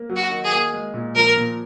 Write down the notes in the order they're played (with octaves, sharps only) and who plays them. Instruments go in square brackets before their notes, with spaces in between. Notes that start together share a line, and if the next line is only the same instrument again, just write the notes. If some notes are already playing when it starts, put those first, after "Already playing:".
Already playing: [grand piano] A#3
F#3
[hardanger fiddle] F#4
[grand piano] D#3
[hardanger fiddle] G#4
[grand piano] A#3
G#3
A#2
[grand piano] F3 [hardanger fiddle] A#4
[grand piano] A#2